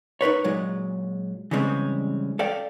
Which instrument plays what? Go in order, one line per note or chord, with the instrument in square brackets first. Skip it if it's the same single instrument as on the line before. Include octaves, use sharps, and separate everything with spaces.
[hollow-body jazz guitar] D#4 A#4 B4 C#5
A#2 F#3 G#3
C#3 E3 G3 G#3 C4 C#4
A4 D5 F5 G5